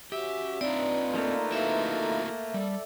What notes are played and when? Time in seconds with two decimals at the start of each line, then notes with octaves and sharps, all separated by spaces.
0.12 C#4 F#4 G4 E5
0.61 C4 D4 D#4 F4 B4 D5
1.12 A3 A#3
1.52 E4 F#4 A4 E5
2.54 G3 A4 D5